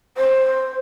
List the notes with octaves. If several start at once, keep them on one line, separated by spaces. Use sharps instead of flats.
C5